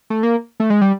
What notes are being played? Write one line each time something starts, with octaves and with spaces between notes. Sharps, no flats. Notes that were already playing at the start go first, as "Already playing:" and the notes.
A3
A#3
A3
G#3
G3